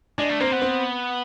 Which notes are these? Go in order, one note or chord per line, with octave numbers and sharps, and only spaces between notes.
G#3 D4
A3
A#3 C4
B3
C4